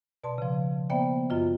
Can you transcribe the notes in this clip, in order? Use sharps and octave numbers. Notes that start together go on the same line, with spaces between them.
B2 D5 A5 C6
C#3 F3
A#3 B3 C5 D5 E5 G5
F#2 F4 D#5 F6